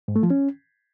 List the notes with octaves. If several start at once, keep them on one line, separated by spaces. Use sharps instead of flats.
G#2
A3
F3
C#4